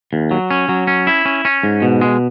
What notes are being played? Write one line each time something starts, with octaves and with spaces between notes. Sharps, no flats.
D#2
F#3
C#4
F#3
C#4
E4
C#4
C#4
G#2
B2
G#3